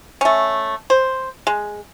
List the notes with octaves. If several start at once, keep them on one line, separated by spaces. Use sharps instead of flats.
A3 C#4
C5
G#3